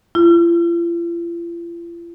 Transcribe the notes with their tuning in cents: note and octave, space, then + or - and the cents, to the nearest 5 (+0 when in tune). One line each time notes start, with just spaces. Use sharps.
F4 -45